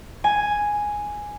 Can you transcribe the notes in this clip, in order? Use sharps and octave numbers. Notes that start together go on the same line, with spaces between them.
G#5